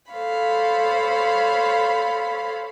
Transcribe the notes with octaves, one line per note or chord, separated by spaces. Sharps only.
A4 C5 C#5 F5 B5